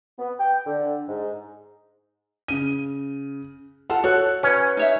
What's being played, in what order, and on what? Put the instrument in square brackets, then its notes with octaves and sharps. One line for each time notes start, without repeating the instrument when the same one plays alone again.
[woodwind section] B3
G5
D3
G#2
[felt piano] C#3 D#7
[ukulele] F4 A4 A5 [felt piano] F#5
[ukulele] F#4 [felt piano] A4 C#5 F#6
[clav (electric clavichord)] C#4 [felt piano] B4
[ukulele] D#4 C#5 E5